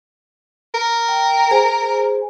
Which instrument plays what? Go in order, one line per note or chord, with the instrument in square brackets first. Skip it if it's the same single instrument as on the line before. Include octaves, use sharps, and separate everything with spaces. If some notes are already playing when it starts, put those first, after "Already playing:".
[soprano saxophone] A#4
[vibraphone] G5
G#4 C5 G#5